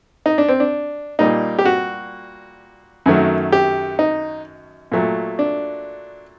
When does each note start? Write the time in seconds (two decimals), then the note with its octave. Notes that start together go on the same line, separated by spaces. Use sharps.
0.26 D#4
0.38 D4
0.49 C4
0.60 D4
1.19 A#2 G3 A#3 D#4
1.59 G4
1.65 F#4
3.06 F#2 D#3 F#3 A3
3.52 G4
3.99 D#4
4.92 A#2 F#3 A3
5.39 D4